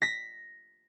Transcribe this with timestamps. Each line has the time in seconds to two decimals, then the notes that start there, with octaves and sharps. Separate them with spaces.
0.02 A#6 B6